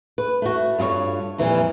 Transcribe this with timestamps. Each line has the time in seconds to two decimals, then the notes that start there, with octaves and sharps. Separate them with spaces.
0.18 B4
0.42 A3 F#4
0.79 G2 F4 G4 C#5
1.38 F2 A#2 E3 F3 G3